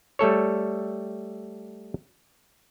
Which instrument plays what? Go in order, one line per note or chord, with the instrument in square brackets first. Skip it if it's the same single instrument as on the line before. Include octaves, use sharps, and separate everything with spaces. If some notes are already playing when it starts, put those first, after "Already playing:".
[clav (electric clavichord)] G3 A3 A4 C#5